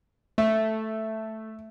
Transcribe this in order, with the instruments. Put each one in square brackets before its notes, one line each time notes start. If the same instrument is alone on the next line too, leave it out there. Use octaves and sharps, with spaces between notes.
[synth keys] A3 [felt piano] E5